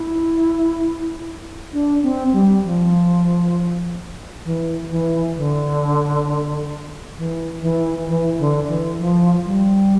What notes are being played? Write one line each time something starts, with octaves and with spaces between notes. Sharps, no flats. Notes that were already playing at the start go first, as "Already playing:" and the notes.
Already playing: E4
D4
C4
G3
F3
E3
E3
D3
E3
E3
E3
D3
E3
F3
G3